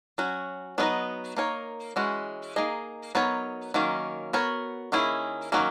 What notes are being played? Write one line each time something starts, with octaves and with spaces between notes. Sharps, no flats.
F#3 C#4 F#4
F#3 B3 D#4 A#4 D#5
A#3 D#4 A#4 C#5
E3 G#3 C#4 F#4
A#3 D#4 G#4 D#5
F#3 B3 D#4 A#4 C#5
D#3 F#3 A#3 C#4
B3 F#4 A#4 C#5
D#3 A#3 C#4 E4 G#4
D#3 F#3 A#3 C#4